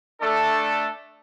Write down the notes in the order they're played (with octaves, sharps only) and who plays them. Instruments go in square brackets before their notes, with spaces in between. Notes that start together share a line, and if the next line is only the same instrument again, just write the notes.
[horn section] A3 D4 A4